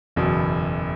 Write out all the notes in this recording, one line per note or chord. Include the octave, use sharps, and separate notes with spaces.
F#1 E2 B2